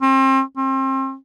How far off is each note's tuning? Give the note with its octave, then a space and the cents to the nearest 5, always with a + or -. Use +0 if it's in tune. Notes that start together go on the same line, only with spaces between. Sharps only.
C4 +35
C4 +35